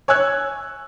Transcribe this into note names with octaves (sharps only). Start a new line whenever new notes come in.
C#5 G#5 E6 F#6 G#6